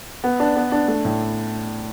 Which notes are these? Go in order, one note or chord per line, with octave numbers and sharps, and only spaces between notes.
B3
D4
B3
D4
A3
A2